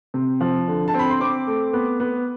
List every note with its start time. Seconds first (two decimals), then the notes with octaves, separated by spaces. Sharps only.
0.14 C3
0.40 F3
0.68 D3
0.88 A5
0.94 C4
0.99 B5
1.10 C6
1.20 C4 D6
1.47 A3
1.73 B3
2.00 B3